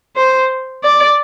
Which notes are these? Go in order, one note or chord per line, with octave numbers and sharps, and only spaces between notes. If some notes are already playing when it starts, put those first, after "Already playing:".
C5
D5